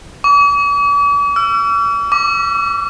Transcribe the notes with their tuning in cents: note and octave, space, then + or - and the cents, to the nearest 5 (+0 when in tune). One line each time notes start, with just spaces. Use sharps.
D6 -45
E6 +45
D6 -5